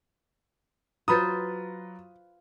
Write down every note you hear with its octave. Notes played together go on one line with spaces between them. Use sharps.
F#3 F4 B4 C5 A#5 B5 D#6 A6